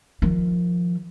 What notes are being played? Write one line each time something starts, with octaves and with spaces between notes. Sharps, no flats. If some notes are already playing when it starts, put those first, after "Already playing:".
D#3 F3